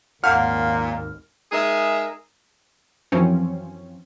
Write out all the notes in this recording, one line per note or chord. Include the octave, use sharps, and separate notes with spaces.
G#1 D#2 A#2 F5 F#5 F6
G#3 D#4 G#4 A#4 E5
F#2 E3 F3 C4 C#4